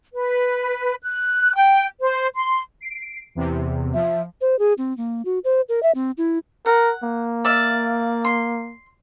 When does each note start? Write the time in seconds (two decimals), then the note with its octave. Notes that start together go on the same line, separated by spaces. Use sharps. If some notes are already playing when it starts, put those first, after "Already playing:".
0.14 B4
1.03 F#6
1.55 G5
2.01 C5
2.35 C6
2.80 C7 D7
3.35 E2 C3
3.94 F3 E5
4.41 C5
4.59 G#4
4.78 C4
4.97 A#3
5.25 F#4
5.44 C5
5.69 A#4
5.83 E5
5.95 C4
6.18 E4
6.66 A#4 F#5
7.03 A#3
7.45 D5 E5 F5
8.25 C6